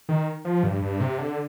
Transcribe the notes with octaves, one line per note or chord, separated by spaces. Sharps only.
D#3
F3
G2
G2
C3
D3